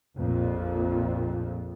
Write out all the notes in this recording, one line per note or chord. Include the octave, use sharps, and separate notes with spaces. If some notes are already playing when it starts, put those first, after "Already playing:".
A#1 F2 A#2